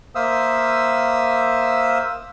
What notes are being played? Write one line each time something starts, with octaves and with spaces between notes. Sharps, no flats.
A#3 C5 E5 F5 D#6 E6